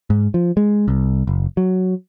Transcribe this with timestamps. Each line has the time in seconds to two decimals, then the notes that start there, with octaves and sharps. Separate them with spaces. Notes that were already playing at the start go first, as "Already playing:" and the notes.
0.10 G#2
0.34 F3
0.57 G#3
0.88 C2
1.27 F#1
1.57 F#3